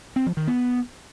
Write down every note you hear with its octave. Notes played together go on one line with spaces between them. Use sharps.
C4
F3
D#3
B3